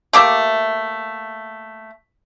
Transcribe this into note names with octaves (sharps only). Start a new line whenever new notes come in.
A3 A#3 G4 E5